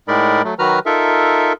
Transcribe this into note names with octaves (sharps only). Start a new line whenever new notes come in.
A2 G#3 D#4 A#4 D5 B5
F#3 A3
D#3 F#3 F#4 B4 A#5 F6
D#4 F4 A4 A#4 E5